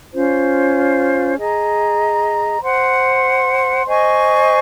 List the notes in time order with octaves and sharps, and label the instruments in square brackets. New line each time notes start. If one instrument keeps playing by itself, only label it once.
[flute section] C#4 F4 C5
G#4 D#5 A#5
C5 F#5 C6
C5 D#5 G#5 C#6